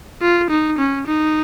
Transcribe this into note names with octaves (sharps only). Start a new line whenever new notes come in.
F4
D#4
C#4
D#4